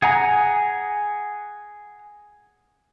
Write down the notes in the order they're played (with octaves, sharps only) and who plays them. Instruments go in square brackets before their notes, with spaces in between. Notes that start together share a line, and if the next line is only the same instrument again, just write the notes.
[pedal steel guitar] G#4 F#5 G#5 A#5 D#6